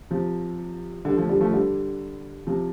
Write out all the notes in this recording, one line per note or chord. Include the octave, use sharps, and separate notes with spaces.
C3 F3
D3 G3
F3 A3
D3 G3
F3 A3
D3 G3
C3 F3